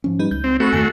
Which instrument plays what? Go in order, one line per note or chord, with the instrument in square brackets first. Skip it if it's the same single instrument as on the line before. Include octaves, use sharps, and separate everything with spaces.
[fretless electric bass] G#2 F3 C#4
[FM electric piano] G3 D#4 B4
[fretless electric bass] C#2 [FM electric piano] G6
[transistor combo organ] C4
[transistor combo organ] A3 F#4 [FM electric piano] C4 B5 C#6
[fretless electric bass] E2 G2 D#3 [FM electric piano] G#5 F#6 C7